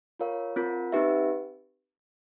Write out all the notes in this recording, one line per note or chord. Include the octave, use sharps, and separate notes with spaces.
F4 A#4 C#5 F5
C4 F4 A#4
C4 D#4 G4 B4 E5